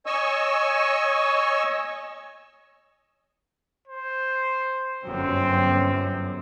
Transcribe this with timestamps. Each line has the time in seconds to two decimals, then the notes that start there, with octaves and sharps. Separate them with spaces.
0.06 C#5 D#5 G#5 C#6 E6
3.88 C5
5.04 G1 F#2 C4